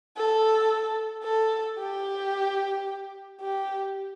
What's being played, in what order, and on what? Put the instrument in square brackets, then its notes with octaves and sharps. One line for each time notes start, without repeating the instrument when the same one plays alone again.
[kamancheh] A4
A4
G4
G4